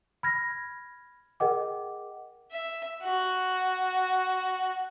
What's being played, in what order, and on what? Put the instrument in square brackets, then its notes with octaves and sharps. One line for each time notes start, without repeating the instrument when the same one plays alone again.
[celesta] B5 F6 G#6 A#6
G#4 A#4 D#5 F#5 G5 D6
[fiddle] E5
F#4